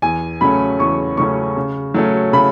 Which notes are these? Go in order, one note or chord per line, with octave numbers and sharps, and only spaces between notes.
E2 G#5
C#3 F#3 A3 C#4 B5
E2 C#6
C#3 F#3 A3 C#4 C#6
C#3
F#3 A3 C#4
C#3 B5